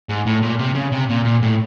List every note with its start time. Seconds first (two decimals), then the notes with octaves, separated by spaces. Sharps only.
0.09 G#2
0.26 A2
0.43 A#2
0.59 C3
0.75 C#3
0.92 C3
1.09 A#2
1.25 A#2
1.42 A2